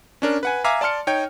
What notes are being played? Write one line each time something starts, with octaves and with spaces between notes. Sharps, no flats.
C#4 D4 A#4
B4 F#5 G#5
E5 F5 G#5 A#5 D6
D5 A5 C6 F6 C#7
D#4 C#5 G5